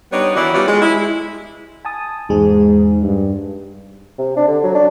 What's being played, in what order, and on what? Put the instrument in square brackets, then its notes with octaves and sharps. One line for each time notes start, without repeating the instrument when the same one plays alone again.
[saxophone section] G3 B3 D4 D#4 C#5
D#3 E3 D4 E4 F#4
G3 B3 C#4 D4 F4 G4
G#3
E4
[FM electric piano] G#5 A5 D#6
[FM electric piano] E2 G#3 G#4 [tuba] G#2
[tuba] G2
[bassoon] C3
D4
D3
F#3
D4